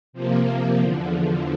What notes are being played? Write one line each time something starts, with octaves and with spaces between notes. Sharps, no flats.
C3 F3 A#3
E2 D3 F3